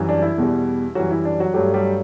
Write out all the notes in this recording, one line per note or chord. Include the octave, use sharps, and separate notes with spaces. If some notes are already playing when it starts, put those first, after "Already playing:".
Already playing: F#2 E3 G3
D4
E4
E2 B2 G3
F#2 E3 F#3 G3 F#4
E4
D4
F#3 F#4
G2 F#3 G3 A3 G4
G3 G4